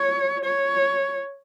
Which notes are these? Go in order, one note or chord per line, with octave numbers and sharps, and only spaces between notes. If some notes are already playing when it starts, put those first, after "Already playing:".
Already playing: C#5
C#5